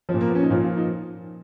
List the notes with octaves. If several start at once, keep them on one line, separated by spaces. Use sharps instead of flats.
F3
A#2
A#3
B3
C#4
D#4
A#2 F3 F4
F4
D#4